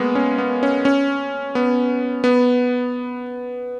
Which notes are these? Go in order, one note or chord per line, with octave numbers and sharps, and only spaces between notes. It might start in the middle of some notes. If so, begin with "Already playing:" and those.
Already playing: G#3 A#3 B3
C#4
B3
C#4
C#4
B3
B3